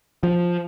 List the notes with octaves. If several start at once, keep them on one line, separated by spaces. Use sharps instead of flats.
F3